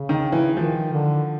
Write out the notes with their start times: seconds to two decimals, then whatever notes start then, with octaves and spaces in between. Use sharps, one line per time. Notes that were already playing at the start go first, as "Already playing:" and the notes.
Already playing: C#3
0.09 D#3
0.32 E3
0.57 D#3 F3
0.93 D3